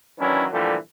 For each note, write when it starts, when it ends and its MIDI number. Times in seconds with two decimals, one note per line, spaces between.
0.19 0.44 51
0.19 0.44 52
0.19 0.44 54
0.19 0.44 61
0.19 0.44 62
0.19 0.44 64
0.51 0.74 46
0.51 0.74 50
0.51 0.74 52
0.51 0.74 53
0.51 0.74 55
0.51 0.74 57